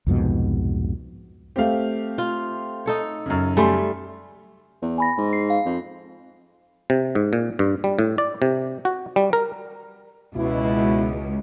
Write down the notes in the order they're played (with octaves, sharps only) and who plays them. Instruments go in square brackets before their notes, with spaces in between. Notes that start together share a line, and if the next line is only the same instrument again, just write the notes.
[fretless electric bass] C2 F2 G#2 B2
[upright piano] A3 C4 [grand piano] G4 F5
[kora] F4
D#4 A4 C#5
[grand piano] F#2 C#3
[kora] G3 A3 [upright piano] G#5 C6
[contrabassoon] E2
[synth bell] G#5 B5 A#6
[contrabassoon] G#2
[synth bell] C7
F5
[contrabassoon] F2
[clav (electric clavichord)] C3
G#2
A#2
G2
G3
A2
D5
C3
F#4
G3
A#4
[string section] C#2 [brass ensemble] B2 E4